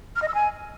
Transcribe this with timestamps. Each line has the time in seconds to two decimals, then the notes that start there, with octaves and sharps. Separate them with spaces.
0.16 F6
0.22 D#5
0.28 E6
0.35 G#5